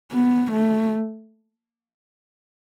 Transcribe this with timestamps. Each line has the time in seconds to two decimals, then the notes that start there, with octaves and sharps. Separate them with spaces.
0.12 B3
0.52 A3